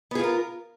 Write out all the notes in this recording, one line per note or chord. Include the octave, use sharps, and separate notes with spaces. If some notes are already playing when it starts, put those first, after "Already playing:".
B3 F4 G#4 A#4